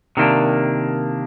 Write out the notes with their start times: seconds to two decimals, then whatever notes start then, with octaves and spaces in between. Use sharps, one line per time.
0.17 C3 D#3 A#3 D4